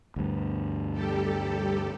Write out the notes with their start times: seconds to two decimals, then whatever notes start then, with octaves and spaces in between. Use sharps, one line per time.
0.16 D2 G2
0.92 G3 G4 A4